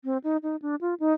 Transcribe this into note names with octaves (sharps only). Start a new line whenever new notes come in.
C4
D#4
D#4
D4
F4
D#4